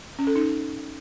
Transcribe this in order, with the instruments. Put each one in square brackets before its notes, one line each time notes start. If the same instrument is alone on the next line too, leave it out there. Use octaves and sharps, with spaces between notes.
[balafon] C#4
A4
D#4